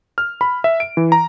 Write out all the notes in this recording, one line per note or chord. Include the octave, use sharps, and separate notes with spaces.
F6
B5
E5
D7
E3
A#5